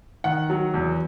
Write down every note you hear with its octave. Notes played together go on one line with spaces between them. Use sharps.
D#3 F#5
F#3
E2